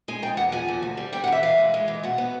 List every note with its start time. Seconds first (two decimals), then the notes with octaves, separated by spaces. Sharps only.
0.08 G#3 G#5
0.22 F3 G5
0.37 E2 F#5
0.52 F3 G#5
0.68 E2
0.82 D2
0.97 G3
1.13 G3 G5
1.24 F#5
1.27 E3 E5
1.43 E3 F5
1.58 G#3
1.74 G#3
1.88 E3
2.03 B2 F#5
2.18 B3